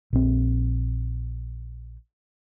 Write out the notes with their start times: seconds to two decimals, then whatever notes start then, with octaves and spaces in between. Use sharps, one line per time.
0.13 A#1 C4